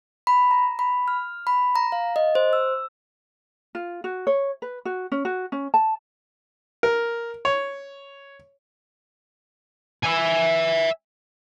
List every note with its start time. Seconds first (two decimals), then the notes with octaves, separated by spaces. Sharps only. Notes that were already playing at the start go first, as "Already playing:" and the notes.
0.27 B5
0.51 A#5
0.79 B5
1.08 F6
1.47 B5
1.76 A#5
1.92 F5
2.16 D#5
2.35 C5
2.53 E6
3.75 F4
4.04 F#4
4.27 C#5
4.62 B4
4.85 F#4
5.12 C#4
5.25 F#4
5.52 C#4
5.74 A5
6.83 A#4
7.45 C#5
10.03 E5 G#5